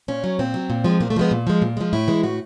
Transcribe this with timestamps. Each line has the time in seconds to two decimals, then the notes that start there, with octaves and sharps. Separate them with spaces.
0.08 A#2 C#4
0.24 F#3
0.39 A#2 C4
0.54 F#3
0.70 A#2
0.84 F3 G#3
1.00 A#2 A#3
1.10 A3
1.16 F3 G#3 B3
1.31 A#2
1.47 F3 G#3
1.62 A#2
1.77 F3 G#3
1.93 A2 E4
2.08 E3 G#3
2.23 A2 F#4